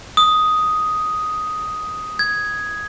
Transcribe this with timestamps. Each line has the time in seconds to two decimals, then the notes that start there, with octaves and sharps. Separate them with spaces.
0.17 D#6
2.19 G#6